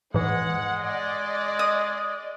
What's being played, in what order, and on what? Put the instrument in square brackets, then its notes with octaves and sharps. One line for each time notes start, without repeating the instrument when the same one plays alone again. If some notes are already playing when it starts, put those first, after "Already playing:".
[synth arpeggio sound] G#2 E3 [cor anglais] G#3 [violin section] F#5
[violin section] D5 D#5
[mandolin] D#6